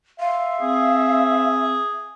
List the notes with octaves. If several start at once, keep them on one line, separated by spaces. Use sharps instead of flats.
E5 F5 C6
C4 G#4